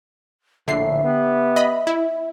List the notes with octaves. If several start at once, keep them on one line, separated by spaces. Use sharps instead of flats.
A#1 A2 D3 E5 C7
B3 G4
D#5 B5
E4